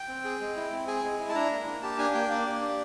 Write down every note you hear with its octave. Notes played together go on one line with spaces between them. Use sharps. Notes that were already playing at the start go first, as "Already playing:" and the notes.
Already playing: G5
C4
G#4
G#3
E4
C4
G#4 G#5
G#3
E4
A5
D4 A#5
A#3
A#3
G4 A5
D4 G#5
A#3 G5
A#3 D5
G4
D4